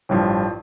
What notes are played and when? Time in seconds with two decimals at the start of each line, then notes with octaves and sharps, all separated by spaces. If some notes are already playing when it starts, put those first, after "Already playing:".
0.09 A1 G2 F3